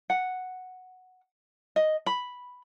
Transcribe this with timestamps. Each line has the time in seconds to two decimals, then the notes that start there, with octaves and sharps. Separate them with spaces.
0.10 F#5
1.76 D#5
2.06 B5